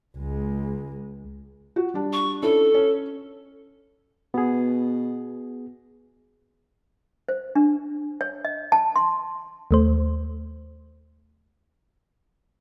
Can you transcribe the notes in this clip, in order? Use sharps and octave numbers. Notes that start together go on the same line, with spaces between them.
C#2 G#3
F#4
G3 D4
C#6
C#4 D4 E4 A4
C#4
B2 B3 G#4
C5
D4
C#5
D#5
A5
C6
D#2 A3 C5